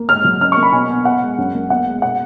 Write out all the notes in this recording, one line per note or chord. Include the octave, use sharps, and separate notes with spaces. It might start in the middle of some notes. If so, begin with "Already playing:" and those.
Already playing: A#3
G#2 F6
F#3
C#3 F6
A#3 C#6
B5
B2 G#5
B3
B3 F#5
G#3
F#2
A#3
B3 F#5
G#3
B2 F#5